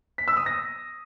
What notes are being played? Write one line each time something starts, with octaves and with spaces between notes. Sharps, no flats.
B6
E6
D#6
A#6